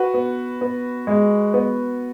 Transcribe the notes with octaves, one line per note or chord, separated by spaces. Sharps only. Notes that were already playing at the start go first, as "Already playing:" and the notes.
Already playing: F#4 B4
B3
B3
G#3
B3